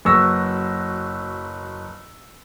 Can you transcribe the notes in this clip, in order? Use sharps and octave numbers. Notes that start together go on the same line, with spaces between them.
F#1 F#3 B4 C#6 E6 A#6